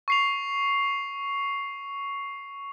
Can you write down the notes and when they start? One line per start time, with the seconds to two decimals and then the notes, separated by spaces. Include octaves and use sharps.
0.08 C#6 C7 F7